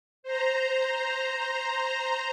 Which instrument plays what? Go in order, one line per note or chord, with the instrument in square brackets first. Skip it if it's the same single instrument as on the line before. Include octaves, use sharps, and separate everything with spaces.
[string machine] C5 A#5